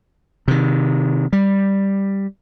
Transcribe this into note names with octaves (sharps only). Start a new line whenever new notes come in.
C3 D#3
G3